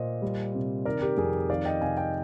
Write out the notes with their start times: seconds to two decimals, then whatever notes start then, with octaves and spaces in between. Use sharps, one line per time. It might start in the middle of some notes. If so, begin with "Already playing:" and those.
Already playing: A#2 C5 D#5
0.22 G3
0.55 C3
0.85 D#3 A#4 D5
1.02 G4 A#4
1.17 F2 G#4
1.50 D#3 D5 F5
1.65 D#5 G5
1.81 C3 F5 G#5
1.97 D#5 G5